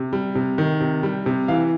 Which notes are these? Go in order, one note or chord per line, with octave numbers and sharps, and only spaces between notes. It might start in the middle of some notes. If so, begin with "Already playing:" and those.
Already playing: C3
G3
C3
D#3
C3
G3
C3
E3 F5